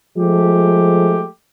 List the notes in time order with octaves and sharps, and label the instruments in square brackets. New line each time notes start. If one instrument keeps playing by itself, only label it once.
[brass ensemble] F3 G#3 A3 G4